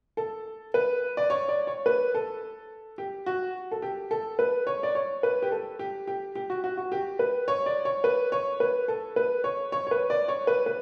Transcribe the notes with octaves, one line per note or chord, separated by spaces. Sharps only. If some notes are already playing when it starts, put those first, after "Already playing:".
A4
B4
D5
C#5
D5
C#5
B4
A4
G4
F#4
A4
G4
A4
B4
C#5
D5
C#5
B4
G4
A4
G4
G4
G4
F#4
F#4
F#4
G4
B4
C#5
D5
C#5
B4
C#5
B4
A4
B4
C#5
C#5
C#5
B4
D5
C#5
B4
B4